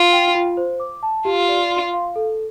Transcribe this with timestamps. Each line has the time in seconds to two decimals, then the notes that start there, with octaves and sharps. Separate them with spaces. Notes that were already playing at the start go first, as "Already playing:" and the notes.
Already playing: F4
0.12 G5
0.35 F4
0.57 C5
0.80 D6
1.03 A5
1.25 F4 G4
1.48 D5
1.71 C6
1.94 F5
2.16 A4